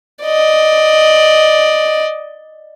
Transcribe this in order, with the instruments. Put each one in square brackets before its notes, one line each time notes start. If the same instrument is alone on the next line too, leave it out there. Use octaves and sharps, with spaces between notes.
[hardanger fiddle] D5 D#5